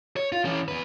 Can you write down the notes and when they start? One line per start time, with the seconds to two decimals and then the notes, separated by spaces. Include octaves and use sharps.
0.16 C#5
0.32 F4
0.45 E3 C#4
0.68 E2 B4